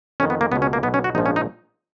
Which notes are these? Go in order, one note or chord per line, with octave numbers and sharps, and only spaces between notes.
F2 D#3 C#4
B3
A#3
C#2 B2 B3
C#4
A#3
B1 B2 B3
C#4
F#4
A#1 G#2 F3 D#4
C#4
D#4